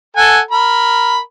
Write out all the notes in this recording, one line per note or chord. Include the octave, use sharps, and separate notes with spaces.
A4 F#5 G#5
A#4 B5